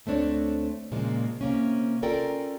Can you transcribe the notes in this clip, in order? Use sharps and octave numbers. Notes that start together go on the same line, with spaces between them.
D2 A3 C4 D4 C#5
A#2 C#3 F3 G#3 A#3
C3 A#3 C#4
C#4 F4 A4 A#4 D5 G5